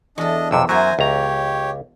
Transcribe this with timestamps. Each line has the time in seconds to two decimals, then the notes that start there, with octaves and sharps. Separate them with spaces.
0.18 E2 D4 A4 D#5
0.51 B1 F2 C3 E6
0.69 F#2 F#3 F#4 C5 E5 F5 G#5 A#5
0.99 C#2 G4 C#5 A#5